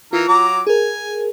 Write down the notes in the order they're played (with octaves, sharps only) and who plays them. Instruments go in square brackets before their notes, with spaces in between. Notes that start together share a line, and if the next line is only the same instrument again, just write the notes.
[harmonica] E3 A#4 [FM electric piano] F4
[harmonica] F#3 A#5 D6
[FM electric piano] G#4 A#4 [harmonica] G#5